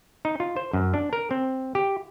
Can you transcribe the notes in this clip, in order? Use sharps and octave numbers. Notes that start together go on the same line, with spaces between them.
D#4
F4
C5
F#2
D4
A#4
C4
G4